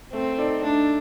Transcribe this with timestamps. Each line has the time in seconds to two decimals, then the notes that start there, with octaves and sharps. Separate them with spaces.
0.13 A3 C4
0.38 D#4 A4 D5
0.63 A3 D4